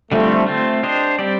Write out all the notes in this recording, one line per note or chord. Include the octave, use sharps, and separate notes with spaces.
D3 F3 G3 A3 C4
A3 C4 F4
D4 G4 C5 D#5
G3 C4 G4 D5